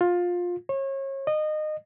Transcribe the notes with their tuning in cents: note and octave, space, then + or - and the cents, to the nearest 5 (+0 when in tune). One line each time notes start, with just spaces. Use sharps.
F4 +15
C#5 -35
D#5 -20